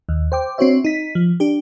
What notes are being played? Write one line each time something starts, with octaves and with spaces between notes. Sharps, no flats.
D#2
C5 G5 D6
C4 D4 F#4 C5 C#5 E5
D#4 B6
F3
D4 G4